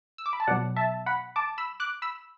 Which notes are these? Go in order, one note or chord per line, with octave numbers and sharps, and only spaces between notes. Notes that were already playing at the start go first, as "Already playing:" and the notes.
E6
D6
B5
A5
B2 F#3 D5 F#5
E5 A5
F#5 B5
A5 D6
B5 E6
D6 F#6
B5 E6